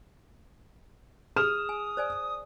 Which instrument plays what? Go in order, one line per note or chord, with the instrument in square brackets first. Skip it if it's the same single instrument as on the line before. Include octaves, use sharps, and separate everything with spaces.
[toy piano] G#4 [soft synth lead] D#6 [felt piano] F6 E7
[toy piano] G#5
C5 D5 G#5